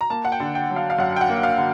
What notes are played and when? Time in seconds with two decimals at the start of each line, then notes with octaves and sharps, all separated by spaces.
0.01 A#5
0.10 A#3 A5
0.25 F#5
0.32 G5
0.40 D3
0.55 G5
0.70 F#3
0.76 F5
0.90 F5
0.99 F#2 F#5
1.16 G5
1.21 F#5
1.30 A#3
1.43 F5
1.58 D3